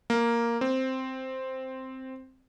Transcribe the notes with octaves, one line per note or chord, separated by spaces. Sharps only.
A#3
C4